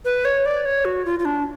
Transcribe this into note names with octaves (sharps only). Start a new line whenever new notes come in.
B4
C#5
D5
C#5
F#4
F4
F4
D4